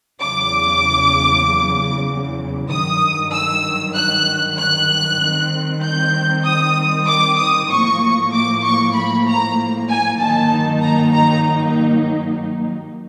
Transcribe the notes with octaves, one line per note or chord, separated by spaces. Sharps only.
E2 C#3 F#3 D6
G2 D#3 F#3 D#6
E6
F#6
F#6
D#3 G3 C4
G6
D#6
D6
D#6
A2 F3 A#3 C#6
D6
C#6
B5
A#5
G#5
G2 D#3 F#3 A#3 D#4 A5
A#5
A#5